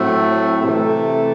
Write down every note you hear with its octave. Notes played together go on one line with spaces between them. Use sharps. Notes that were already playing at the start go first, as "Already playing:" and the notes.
Already playing: A2 F#3 A3 C4
C3 E3 A3